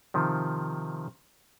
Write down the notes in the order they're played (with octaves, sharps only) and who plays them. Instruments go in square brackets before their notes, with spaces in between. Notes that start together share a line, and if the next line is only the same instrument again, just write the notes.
[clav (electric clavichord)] C3 D#3 F3